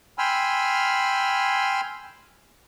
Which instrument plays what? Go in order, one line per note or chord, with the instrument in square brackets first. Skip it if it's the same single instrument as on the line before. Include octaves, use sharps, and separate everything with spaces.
[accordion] G5 G#5 B5 C6 E6 F6